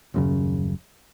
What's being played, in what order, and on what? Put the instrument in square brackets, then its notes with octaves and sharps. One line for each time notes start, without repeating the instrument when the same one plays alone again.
[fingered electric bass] D#1 F#2 C#3